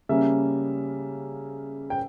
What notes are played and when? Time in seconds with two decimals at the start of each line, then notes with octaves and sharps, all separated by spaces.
0.09 C#3 G3 A#3 C#4 E5
1.90 G5